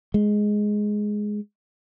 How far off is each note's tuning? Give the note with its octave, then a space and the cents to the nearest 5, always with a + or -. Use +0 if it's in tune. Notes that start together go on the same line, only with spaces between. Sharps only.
G#3 +5